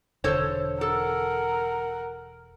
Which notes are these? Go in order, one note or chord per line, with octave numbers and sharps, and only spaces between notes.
E1 D3 A4 C5 C#5
A4 A#4 F#5